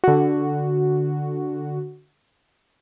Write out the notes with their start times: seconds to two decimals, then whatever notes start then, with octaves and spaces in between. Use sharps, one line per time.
0.04 D3 F#4